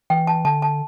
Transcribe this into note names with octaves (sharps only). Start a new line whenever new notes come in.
E3 G5
A5
D3 A5
A5